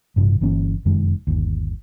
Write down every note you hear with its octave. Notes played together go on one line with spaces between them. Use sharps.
A1 G2 C3 F3
G1 E3 A#3 C#4
F1 F#2 D#3 G#3
G1 D#2